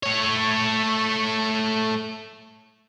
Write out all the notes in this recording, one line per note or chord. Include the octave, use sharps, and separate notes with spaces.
A3 C#5